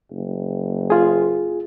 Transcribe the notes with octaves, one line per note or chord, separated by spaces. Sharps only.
F#1
F4 G#4